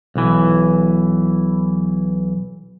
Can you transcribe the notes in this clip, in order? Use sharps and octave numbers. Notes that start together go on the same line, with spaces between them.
B1 E3